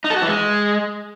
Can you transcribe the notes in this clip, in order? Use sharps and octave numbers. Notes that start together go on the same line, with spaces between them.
D#4
A4
F#4
E3
G#3